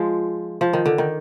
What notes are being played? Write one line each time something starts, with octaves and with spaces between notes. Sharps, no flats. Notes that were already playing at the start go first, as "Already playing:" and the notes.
Already playing: F3 G#3
F3
D#3
D3
D#3